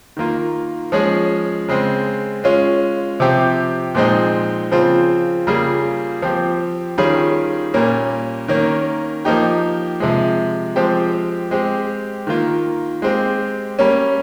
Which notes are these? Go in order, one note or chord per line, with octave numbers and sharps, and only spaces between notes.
D#3 A#3 F4
F3 G#3 C#4 G#4
C#3 G#3 C4
G#3 C#4 F4
C3 F3 C4 G4
A#2 F3 G#3 C4 D#4
C#3 F3 C4 F4
C#3 G3 A#3 F4 G#4
F3 C4 G4
D#3 G3 C#4 F4 G#4
A#2 G3 A#3 C#4
D#3 A#3 C#4
F3 A#3 D#4 G4
C3 F3 G#3
F3 G#3 C4 G4
G#3 C4 G4
D#3 A#3 F4
G#3 C4 G4
G3 A#3 C#4